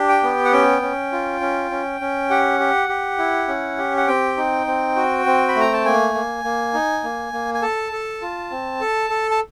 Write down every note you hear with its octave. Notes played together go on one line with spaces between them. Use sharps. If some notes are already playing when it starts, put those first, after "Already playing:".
Already playing: D4 G4
G5
B3
F#5
C#4 G5
C#4
F4
C#4
C#4
C#4
G4 F#5
G4
G4
E4
C#4
G4
F#5
C4 G5
D#4
C4
F#4
C4
B5
A3
A#5
A5
A#3 G#5
A#3
A#3
D#4
A#3
A#3
G#5
A4 A5
A4
F4
C4
A4
A4
A5